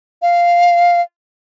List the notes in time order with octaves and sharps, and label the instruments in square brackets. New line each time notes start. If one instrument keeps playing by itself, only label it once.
[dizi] F5